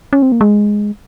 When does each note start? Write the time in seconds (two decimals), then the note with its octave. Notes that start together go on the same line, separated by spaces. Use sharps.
0.13 C#4
0.22 C4
0.32 A#3
0.41 G#3